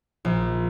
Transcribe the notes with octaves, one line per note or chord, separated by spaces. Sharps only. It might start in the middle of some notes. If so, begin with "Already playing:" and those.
A#1